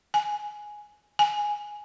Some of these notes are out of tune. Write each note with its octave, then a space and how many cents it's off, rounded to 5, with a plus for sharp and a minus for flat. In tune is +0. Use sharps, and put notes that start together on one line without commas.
G#5 +5
G#5 +0